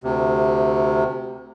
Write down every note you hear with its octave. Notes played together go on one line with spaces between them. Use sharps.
D2 C3